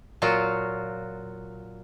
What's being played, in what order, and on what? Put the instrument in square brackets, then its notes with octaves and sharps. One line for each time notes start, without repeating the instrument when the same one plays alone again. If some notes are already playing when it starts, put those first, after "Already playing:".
[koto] A#2 F#3 F4 F#4